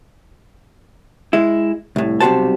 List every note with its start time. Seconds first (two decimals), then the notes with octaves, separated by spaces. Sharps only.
1.33 G#3 E4
1.96 C2 A2
2.20 B1 C3 G3 F#4 C5 A5